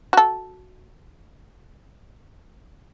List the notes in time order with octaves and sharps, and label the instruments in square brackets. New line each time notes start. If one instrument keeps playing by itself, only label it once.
[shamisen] F#4 A4